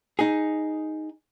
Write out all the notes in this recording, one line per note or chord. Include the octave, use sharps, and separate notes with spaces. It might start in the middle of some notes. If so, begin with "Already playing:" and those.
D#4 G#4